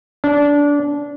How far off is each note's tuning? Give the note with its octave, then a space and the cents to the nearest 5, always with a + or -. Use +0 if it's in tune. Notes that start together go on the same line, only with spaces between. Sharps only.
D4 -20